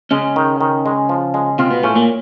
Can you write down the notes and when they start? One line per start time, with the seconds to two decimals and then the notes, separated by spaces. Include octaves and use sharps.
0.11 C#3 G#3 C#4
0.36 D#3
0.61 D#3
0.86 G#3
1.09 F3
1.34 G#3
1.59 C3 C4 F4
1.71 B2 B3
1.83 A2 A3 C#4
1.95 A#2 A#3